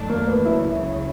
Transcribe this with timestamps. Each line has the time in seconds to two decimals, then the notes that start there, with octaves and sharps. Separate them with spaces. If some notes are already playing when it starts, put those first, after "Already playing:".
Already playing: F#2 D#3 F#3 A3 D4
0.10 A#3
0.27 B3
0.45 C#2 C#3 F#3 E4